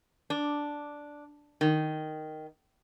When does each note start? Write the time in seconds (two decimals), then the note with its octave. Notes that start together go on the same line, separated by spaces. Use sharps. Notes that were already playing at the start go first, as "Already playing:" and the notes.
0.30 D4
1.61 D#3